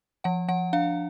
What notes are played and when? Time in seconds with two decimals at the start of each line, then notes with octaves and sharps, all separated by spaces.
0.24 F3 F#5
0.48 F3 F#5
0.73 D4 F5